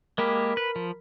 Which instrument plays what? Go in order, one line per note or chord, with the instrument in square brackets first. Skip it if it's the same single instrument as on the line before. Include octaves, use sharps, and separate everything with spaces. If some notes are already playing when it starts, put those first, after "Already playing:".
[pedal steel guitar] G#3 A#3 G4 [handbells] A#4 B5 B6
[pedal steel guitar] B4
F3